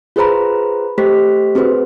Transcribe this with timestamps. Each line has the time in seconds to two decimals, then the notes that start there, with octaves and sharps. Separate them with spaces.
0.16 F4 G#4 B4 C5 A#5 B5
0.98 A3 G4 C5 B6
1.55 C4 F#4 G#4 B4 C5